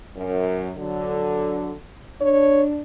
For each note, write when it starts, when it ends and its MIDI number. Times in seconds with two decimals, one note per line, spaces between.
0.16 0.71 42
0.77 1.71 50
0.77 1.71 54
2.21 2.81 62
2.21 2.63 73